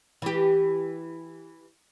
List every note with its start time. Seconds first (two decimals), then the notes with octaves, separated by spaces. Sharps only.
0.22 E3 G4